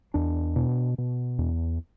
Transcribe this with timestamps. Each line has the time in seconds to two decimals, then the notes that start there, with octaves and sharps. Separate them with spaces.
0.14 E2 D4
0.56 B2
0.98 B2
1.39 E2